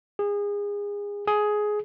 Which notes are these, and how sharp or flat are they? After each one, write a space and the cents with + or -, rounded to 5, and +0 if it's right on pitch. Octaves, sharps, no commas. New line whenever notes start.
G#4 -30
G#4 +10